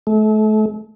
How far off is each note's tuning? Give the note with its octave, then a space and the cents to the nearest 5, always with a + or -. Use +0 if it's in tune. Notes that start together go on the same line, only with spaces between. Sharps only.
A3 -35